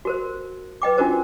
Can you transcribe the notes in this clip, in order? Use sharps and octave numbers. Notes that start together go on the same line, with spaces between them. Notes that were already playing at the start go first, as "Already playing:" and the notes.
F#4 A#4 C5
B4 D#5 G5 D6
C#4 D4 F4 F#4 A#4 C5